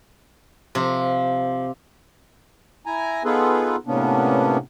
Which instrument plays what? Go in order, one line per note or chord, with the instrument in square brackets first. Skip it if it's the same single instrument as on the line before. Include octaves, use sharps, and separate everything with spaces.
[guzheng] C3 [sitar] F3
[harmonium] E4 G#5 A#5
B3 D#4 F4 G#4 A4 B4
A2 C3 A#3 B3 C#4 D4